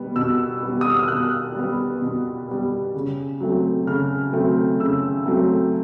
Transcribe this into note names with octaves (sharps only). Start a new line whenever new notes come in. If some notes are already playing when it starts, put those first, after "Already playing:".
Already playing: B2 G3 B3
B2 E6
G3 B3
D#6
E6
F6
B2 F#6
G3 B3
B2
G3 B3
C#3
F#3 A3 C4
C#3 F6
F#3 A3 C4
C#3 E6
F#3 A3 C4